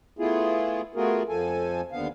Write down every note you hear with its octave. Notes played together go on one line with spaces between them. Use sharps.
A3 B3 E4 F4 G#4
A3 B3 F4 F#4 G#4 A#4
F2 F3 A4 G#5
D#2 D3 B3 F5